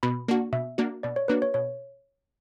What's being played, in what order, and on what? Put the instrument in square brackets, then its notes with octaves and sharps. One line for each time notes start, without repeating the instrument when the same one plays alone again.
[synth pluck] B2 [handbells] B5
[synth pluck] A#3 D4 F#4
[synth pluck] B2 [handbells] E5
[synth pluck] A#3 D4 F#4
[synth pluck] B2 [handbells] D5
[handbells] C#5
[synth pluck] A#3 D4 F#4 [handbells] B4
[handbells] C#5
[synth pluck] B2 [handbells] C#5